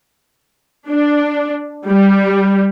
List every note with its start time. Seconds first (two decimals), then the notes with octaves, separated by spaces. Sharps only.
0.88 D4
1.86 G3